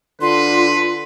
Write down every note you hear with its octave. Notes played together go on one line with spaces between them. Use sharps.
D3 F4 B4 C6